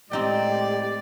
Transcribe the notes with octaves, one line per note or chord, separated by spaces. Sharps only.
A2 G#3 C4 D#4 G4 D5 G5